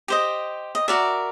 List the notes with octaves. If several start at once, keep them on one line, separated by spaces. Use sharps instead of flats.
G4 C5 D#5
D#5
F#4 A#4 D5 E5